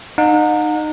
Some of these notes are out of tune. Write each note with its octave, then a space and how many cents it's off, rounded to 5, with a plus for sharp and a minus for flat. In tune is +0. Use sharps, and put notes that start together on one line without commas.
D#4 -25 F#5 -40